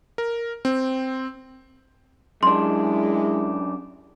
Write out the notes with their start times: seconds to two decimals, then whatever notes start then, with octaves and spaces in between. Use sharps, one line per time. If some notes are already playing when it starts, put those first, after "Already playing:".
0.18 A#4
0.65 C4
2.43 F#2 G#3 D4 E4 C6